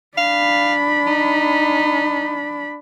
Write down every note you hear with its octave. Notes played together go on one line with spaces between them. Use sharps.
D4 F5 B5
D#4